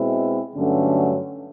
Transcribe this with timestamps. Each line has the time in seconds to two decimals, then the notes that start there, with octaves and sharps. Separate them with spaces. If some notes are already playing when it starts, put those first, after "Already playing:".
Already playing: B2 G#3 C4 E4
0.55 G2 D3 F#3 A3 C#4